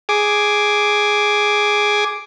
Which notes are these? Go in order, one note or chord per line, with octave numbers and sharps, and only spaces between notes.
G#4 D6